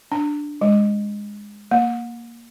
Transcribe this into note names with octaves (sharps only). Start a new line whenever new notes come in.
D4
G#3
A#3